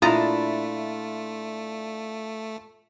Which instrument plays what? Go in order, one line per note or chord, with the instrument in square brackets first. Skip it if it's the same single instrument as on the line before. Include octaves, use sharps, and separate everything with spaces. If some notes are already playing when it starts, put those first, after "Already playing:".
[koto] A#2 D#5 A#5 [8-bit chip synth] A3 [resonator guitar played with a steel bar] D4 E4 [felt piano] F4 A6